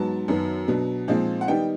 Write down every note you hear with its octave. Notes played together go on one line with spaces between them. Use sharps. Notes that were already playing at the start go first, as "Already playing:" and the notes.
Already playing: G#2 F#3 B3 A5
F#2 D#3 F#3 B3
B2 F#3 B3 D4
A#2 F3 G#3 C4 D#4
F#5
D#3 G3 B3 D#4 G5